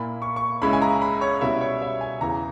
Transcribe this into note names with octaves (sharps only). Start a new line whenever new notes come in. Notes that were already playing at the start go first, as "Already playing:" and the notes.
Already playing: A#2 A#3 E4 B5
C#6
C#6
C#2 C#3 G#3 C#4 E4 B5
G#5
A#5
B5
C#5
B2 G3 C#4 E4 E5
C#5
E5
G#5
E2 C#3 E3 A#5